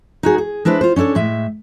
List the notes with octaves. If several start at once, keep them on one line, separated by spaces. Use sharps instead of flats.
D#4 F#4 G#4
G#4
G#3 D4 E4 B4 C5
F4 C5
C#4 D4 E4 A4 C#5
A2 G#3 E5